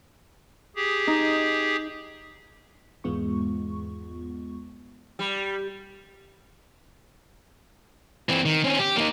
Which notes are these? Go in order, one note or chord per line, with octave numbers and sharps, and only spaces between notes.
G4 G#4
D#4
E2 G#2 G#3 B3 F4 C#6
G3
E3 C4
D#3
C4 C#4
G4
A#3 D#4